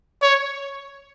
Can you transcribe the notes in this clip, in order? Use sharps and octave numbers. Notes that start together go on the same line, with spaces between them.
C#5